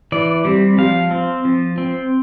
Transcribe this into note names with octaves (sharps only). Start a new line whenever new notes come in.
E3 D5
G3 C4
F3 F5
C4
F3
C4